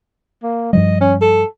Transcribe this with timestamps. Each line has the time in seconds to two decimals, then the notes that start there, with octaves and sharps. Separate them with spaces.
0.43 A#3
0.73 G2 F3 G3 D#5
1.01 C#4
1.21 A4